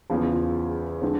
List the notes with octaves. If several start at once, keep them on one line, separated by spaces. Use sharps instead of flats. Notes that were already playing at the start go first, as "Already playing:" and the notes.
E2 C#3 F3
F4
D3 F3 G#3 C4